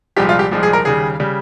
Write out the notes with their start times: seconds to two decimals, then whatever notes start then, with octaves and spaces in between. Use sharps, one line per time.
0.16 C2 A#2 F3 G#3 G4
0.29 F4
0.39 G4
0.51 C2 A#2 F3 G#3
0.63 G#4
0.73 A#4
0.85 D#2 C#3 G3 G#4
1.20 C#3 G3